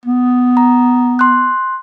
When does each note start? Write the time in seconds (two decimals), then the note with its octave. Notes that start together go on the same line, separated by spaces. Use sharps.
0.05 B3
0.57 A#5
1.19 C6 F#6